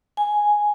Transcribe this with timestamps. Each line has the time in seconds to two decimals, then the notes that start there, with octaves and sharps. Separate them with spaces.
0.17 G#5